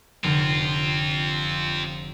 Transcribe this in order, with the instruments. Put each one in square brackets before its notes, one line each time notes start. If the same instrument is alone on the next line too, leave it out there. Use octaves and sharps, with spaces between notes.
[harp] F1 D3 D7 [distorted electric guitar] C4 F4